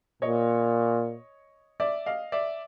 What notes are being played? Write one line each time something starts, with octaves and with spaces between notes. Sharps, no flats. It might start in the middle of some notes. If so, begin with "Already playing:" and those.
A#2 C#5 D#5
D5 E5
D#5 F5
D5 E5